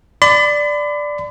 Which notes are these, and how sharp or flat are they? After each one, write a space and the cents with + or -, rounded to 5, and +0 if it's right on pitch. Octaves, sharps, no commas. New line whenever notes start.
D5 +0 B5 +40